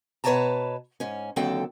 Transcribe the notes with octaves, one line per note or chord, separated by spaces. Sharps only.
B2 B4 C#5 D5 A5 A#5
G#2 C#4
D#2 D3 F#3 C4 A4 G5